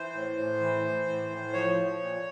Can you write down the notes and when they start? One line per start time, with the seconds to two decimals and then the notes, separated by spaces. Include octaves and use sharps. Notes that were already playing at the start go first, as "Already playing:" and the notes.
Already playing: E3 C5
0.13 A2
0.37 A2
0.60 E3
0.83 E3
1.07 A2
1.30 A2
1.53 F3 C#5
1.76 F3
1.99 A#2